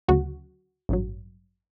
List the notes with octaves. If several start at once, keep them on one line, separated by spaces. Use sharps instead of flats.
D2 C#3 F#3 F#4
A1 G2 F#3